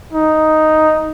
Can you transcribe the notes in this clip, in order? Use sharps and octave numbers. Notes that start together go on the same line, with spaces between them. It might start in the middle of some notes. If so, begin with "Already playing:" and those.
D#4